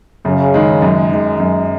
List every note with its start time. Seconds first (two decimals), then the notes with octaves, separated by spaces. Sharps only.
0.25 F#2 C#3
0.54 D#3 G#3
0.82 F#2
1.11 D#3 G#3
1.40 F#2